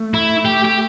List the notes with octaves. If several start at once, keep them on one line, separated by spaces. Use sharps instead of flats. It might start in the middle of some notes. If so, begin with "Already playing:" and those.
Already playing: A3
E4
G4
G4